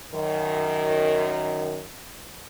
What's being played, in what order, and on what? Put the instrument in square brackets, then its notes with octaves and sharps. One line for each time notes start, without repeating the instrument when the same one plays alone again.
[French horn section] F#2 D#3